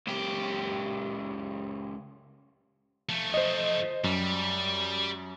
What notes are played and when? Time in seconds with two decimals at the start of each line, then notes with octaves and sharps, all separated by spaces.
0.07 C#2 G4
3.09 F3 A3
3.34 C5 D#5
4.04 F#2 G3